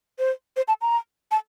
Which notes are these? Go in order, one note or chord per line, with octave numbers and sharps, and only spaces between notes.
C5
C5
A5
A#5
A5